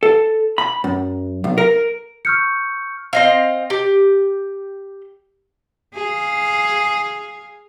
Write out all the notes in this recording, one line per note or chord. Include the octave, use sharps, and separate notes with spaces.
A4
B5
F#2
B1
A#4
C#6 E6 F6 G6 C#7
C4 D#5 F5
G4
G#4 F5